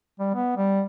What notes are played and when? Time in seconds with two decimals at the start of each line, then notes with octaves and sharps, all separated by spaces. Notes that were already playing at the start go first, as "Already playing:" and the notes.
0.19 G3
0.34 B3
0.57 G3